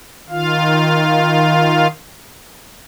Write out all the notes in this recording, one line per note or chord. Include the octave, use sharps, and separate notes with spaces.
D#3 F4 F5